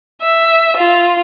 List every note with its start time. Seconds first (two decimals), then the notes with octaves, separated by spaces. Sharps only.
0.22 E5
0.77 F4